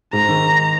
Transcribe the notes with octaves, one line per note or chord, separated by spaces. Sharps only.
G#2 A#5
D#3